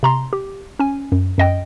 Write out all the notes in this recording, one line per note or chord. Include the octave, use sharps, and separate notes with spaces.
C3 A#5 C6
G4
C#4 G#5
F#2
F#2 D#5 G5